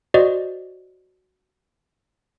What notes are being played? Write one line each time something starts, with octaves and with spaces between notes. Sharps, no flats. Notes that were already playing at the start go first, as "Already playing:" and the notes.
F#4 C5 D5 D#5